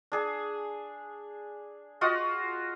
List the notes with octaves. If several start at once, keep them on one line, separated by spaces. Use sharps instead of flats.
D4 G#4
F4 F#4 D#5